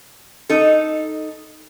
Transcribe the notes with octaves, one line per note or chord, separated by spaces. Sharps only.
D#4 A4